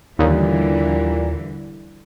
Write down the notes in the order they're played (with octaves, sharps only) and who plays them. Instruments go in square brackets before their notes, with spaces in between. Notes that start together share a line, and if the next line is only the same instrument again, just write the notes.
[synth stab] D#2 [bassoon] A#2 [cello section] D3 E3 G3